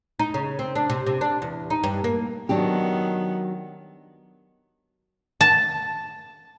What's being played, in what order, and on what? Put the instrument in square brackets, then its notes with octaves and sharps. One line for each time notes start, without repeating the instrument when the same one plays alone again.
[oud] D#4
C#3
C4
D4
C3
C3
D4
E2
D#4
G2
A#3
[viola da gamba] D#3 B3 [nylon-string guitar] F#3 D4 G4
[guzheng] A5